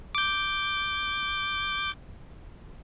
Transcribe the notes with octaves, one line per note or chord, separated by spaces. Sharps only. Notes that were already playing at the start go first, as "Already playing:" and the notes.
D6 G6